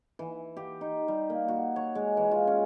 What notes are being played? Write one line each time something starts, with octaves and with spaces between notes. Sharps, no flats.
E3
G4
D#4
G3
A#3
F#4
C#5
G#3
E3
F4
C#4